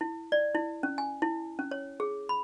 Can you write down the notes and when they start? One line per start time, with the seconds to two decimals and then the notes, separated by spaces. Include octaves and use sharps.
0.01 E4
0.32 D5
0.55 E4
0.83 C#4
0.98 G#5
1.22 E4
1.59 C#4
1.71 C#5
2.00 G#4
2.29 B5